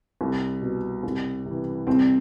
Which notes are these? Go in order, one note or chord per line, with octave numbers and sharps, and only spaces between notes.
C2
B2
C2
C3
E3
C2 C4